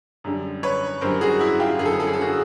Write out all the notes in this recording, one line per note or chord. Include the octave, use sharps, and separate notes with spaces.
F#2 D3 G3
B4 C#5
F#2 D3 G3 A#4 C5
F#4 G#4
E4 F#4
F4 G4
F#2 D3 G3 G#4
A4
G#4
A4
G#4
A4
F#4 G#4